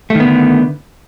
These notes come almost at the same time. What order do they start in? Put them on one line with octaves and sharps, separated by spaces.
A3 D#3 B3 D3